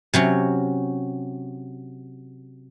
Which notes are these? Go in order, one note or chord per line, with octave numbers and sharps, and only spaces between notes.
C3 F#3 C#4